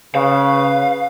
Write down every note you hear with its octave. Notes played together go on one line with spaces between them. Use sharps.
C#3 B4 F5